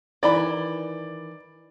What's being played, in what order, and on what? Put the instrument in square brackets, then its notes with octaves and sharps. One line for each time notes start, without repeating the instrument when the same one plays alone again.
[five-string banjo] D#3 E3 B5 [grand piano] D5